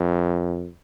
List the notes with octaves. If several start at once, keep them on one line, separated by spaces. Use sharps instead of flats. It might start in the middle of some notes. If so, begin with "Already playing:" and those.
Already playing: F2